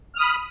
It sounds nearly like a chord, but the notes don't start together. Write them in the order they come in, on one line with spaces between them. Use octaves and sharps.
F6 D#6 B5